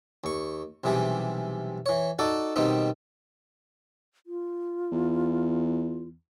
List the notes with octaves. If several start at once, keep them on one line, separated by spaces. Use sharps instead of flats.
D#2 C#6
B1 C3 E3 G3 G#4
E3 C#5
D#4 F#4 A4 D5
B2 D#3 G3 B3 C4 D#4
F4
E2